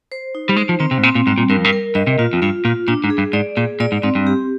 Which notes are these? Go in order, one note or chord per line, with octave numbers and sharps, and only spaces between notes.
C5
D#4
G3
G#3 C5
F3
D#3 C4
C3
G#2
A#2 C4
A#2
G#2 G3
A#2
G2 A#4
F2
G2
A#4
G2 D#5
C3
A#2 F4
F2
G2 F4
A#2 F4
A#2 D4
G#2
G#4
G2
G#2 D5
A#2 G#4
A#2 D5
G#2
G#2 C4
G2
G4